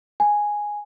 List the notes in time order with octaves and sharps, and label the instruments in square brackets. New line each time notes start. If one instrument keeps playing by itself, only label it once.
[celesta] G#5